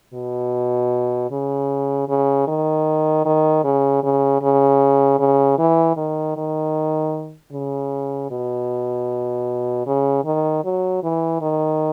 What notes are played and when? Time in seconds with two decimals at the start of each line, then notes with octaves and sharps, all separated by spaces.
0.14 B2
1.31 C#3
2.09 C#3
2.48 D#3
3.25 D#3
3.64 C#3
4.03 C#3
4.42 C#3
5.19 C#3
5.59 E3
5.97 D#3
6.37 D#3
7.52 C#3
8.30 B2
9.86 C#3
10.25 D#3
10.64 F#3
11.03 E3
11.42 D#3